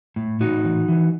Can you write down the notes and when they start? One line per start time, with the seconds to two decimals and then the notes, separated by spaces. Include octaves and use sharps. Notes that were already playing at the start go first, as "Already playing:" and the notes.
0.16 A2
0.40 A2 D#4 F#4
0.64 E3
0.89 E3